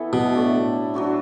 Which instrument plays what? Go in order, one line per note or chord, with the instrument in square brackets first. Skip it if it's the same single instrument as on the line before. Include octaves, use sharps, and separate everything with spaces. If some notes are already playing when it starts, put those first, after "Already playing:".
Already playing: [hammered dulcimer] E3 B3 E4 A4
[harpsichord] B2
[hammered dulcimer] A2 A3 D4 A4
F#3 D4 F#4 A4